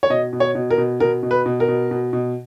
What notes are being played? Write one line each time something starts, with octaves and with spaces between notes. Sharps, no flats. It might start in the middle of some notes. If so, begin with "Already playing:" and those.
C#5
B2 D#5
B2
C#5
B2
A#4
B2
B2 A#4
B2
B4
B2
A#4
B2
B2
B2